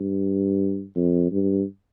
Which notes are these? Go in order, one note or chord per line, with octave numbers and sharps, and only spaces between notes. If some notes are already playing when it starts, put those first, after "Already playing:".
Already playing: G2
F2
G2